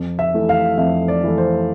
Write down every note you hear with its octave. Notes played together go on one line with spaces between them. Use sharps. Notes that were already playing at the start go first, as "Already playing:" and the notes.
Already playing: F2
E5
E3 A3
F5
F2 E5
D5
E3 A3
C5